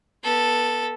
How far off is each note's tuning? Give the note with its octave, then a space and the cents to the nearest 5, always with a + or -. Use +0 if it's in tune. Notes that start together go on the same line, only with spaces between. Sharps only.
B3 -30 A4 +0